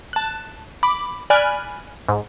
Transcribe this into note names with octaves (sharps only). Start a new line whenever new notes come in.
A5 F#6
B5 D6
D5 G#5 B5 F6 F#6
G#2